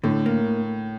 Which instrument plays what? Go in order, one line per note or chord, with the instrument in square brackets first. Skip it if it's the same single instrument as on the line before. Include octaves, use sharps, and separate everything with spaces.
[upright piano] A2 [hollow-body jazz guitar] D3
[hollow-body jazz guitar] A#3